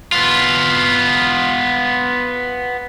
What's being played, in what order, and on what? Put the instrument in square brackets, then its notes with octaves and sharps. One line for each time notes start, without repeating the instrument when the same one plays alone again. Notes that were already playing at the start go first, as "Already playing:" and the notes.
[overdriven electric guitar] B3 F4